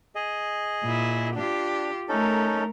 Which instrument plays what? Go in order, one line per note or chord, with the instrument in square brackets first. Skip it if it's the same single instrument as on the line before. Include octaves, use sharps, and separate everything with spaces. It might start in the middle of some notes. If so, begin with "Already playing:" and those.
[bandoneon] G#4 D#5
[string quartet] A#2 E4
[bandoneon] D4 [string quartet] F4 G4
[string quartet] A3 A#4 [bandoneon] C#4 D#4 A4